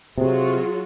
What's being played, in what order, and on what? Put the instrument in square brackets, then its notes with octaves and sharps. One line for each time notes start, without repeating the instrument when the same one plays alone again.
[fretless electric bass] C3 [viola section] F#3 F4 F#4 [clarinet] G#4